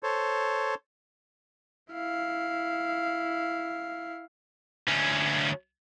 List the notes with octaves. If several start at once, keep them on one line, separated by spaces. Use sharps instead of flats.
A4 C5 C#5
E4 F5
D2 C#4